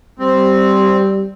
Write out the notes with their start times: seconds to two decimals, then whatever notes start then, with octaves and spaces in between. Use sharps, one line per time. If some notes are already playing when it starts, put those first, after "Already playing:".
0.19 G3 C4